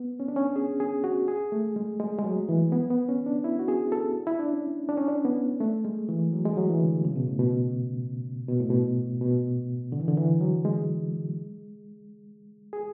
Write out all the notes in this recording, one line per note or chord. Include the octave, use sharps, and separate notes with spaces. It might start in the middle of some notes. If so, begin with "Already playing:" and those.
Already playing: B3
C#4
D4
C#4
G#4
G#4
F#4
G#4
A3
G#3
G#3
G#3
F#3
E3
B3
B3
C#4
D4
E4
F#4
G#4
A4
E4
D4
C#4
D4
C#4
D4
B3
A3
G#3
E3
F#3
G#3
F#3
E3
D3
C#3
B2
A2
B2
B2
A2
B2
B2
D3
E3
D3
E3
F#3
G#3
G#4